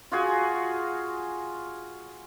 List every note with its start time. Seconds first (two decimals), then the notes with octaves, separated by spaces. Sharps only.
0.12 F4 F#4 G#4 G#5